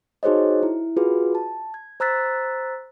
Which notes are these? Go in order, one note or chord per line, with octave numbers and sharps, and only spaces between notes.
D#4 F#4 G#4 C5 C#5 D#5
E4
F4 F#4 G#4 B4
A5
G#6
C5 A#5 E6 F#6 A6 B6